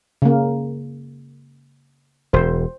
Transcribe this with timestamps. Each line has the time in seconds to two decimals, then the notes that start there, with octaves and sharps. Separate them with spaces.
0.22 C#3 A#3
2.33 E1 C5